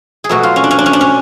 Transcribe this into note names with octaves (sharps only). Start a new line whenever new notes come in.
G#4
B2 F#3 A3 F#4
F4
C#4
D4
C#4
D4
C#4
D4
C#4